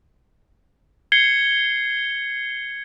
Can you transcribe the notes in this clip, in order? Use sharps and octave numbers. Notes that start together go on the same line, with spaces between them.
G#6 C7 C#7 G7